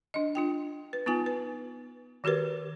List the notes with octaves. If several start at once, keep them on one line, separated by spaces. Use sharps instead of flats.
D4 D#5
D4 F4 G5
B4
B3 D#4 F4 G#5
B4
D#3 F#4 G4 A#4 B4